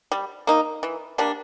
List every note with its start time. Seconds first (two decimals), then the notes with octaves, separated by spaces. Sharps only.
0.12 G3
0.47 A#3 D#4
0.83 E3
1.18 G3 A#3 D4